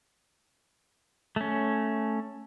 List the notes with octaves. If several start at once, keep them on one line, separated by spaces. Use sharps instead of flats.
A3 C#4